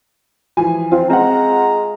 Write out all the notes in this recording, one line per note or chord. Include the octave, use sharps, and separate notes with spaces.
E3 F3 G#5
C4 F4
G#3 C4 F#5 A#5